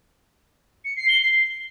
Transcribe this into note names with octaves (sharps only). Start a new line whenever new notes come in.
C#7
C7
G7
C7